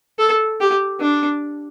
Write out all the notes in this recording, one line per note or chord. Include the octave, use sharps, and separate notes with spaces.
A4
G4
D4